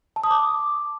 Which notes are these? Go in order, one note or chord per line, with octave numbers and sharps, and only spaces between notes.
A5
D#6
D6